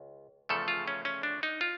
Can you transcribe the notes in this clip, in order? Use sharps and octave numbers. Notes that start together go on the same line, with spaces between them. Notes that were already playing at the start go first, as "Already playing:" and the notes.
Already playing: C#2
E2 C#3 F3 A3 A4
F4
C#4
C#4
D4
D#4
F4